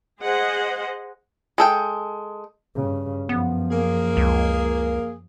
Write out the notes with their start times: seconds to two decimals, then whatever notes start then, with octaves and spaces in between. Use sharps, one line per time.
0.21 G#4 C5 D#5 F#5
1.58 G#3 A4 G5
2.75 G2 C#3
3.29 F#2 F3 B3
3.71 A#3 G#4
4.17 C#2